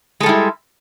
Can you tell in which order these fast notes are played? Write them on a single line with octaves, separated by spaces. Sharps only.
G#3 A4 G3 E4